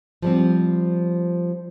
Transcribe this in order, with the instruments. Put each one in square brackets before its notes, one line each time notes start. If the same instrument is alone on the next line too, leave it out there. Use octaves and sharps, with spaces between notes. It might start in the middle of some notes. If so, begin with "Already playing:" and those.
[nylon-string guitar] F3 G3 C4